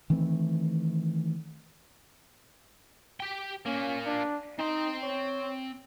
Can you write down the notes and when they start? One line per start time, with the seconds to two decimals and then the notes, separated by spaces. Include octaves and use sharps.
0.10 D#3 E3 A3 C4
3.20 G4 G5
3.66 A#2 A#3 C#4
4.06 D4
4.59 C4 D#4 C6
5.03 C#5